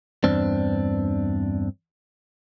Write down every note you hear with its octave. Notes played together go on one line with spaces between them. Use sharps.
E2 G2 C4 D4